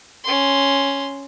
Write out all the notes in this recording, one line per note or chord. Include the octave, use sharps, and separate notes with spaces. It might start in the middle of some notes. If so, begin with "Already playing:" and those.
C#4 C6